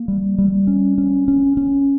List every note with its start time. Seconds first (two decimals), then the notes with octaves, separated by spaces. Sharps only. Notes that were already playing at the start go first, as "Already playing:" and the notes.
Already playing: A#3
0.08 G3
0.38 G3
0.67 C#4
0.98 C#4
1.28 C#4
1.57 C#4